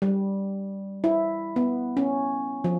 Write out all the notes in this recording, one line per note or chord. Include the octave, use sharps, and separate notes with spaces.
G3
E4
B3
C#4
F3